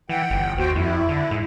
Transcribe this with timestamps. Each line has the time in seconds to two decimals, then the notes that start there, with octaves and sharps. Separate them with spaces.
0.09 E3 F#5 G5
0.30 G1
0.58 D#2 F#4 C5 G5
0.75 F2 E4
1.09 D3
1.31 G#2